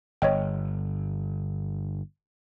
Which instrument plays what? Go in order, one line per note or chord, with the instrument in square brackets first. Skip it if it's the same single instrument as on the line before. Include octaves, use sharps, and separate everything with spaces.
[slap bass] G1 [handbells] C#5 D#5 G5